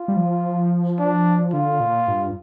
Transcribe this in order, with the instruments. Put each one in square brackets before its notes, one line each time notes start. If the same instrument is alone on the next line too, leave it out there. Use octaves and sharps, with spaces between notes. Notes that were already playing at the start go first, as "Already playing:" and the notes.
Already playing: [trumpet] F4
[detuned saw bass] G3
F3
[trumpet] D4
[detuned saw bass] D3 [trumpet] F4
[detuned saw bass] A#2
G2